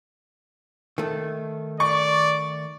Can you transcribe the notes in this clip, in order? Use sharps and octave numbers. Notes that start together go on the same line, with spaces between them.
D#3 A3
D5 C#6